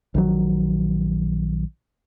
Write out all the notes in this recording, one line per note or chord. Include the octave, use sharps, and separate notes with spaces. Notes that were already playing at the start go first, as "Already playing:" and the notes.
A#1 D#3 F#3